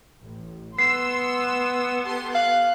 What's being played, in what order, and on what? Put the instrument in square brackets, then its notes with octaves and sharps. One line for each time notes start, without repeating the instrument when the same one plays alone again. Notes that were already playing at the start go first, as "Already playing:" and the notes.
[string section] A1
[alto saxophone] B3 [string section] C6 E6 [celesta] C7
[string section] G4 A4 C6
[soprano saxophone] F5 [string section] F#6